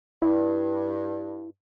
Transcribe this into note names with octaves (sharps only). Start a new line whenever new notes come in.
G2 E4